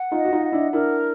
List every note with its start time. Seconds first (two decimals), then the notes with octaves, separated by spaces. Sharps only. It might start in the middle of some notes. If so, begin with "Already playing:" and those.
Already playing: F#5
0.11 D#4 F4
0.18 D#5
0.25 F#4
0.32 D#4 F4
0.46 F#5
0.52 D4 E4
0.73 D4 E4 A#4